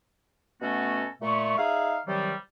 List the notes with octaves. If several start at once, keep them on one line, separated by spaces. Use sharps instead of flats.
B2 A3 B3 C#4 F#4 A4
A#2 A3 C#6
D#4 G#4 E5 F5
C3 D#3 F#3 G3